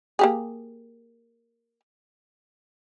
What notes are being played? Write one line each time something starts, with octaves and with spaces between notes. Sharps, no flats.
A#3 G4 G#4